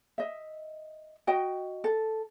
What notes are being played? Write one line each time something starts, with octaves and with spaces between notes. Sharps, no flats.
D#5 E5
F#4 D#5 G5
A4